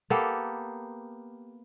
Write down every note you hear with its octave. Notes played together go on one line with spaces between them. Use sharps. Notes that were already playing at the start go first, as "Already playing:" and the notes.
A#3 B3 G4 A4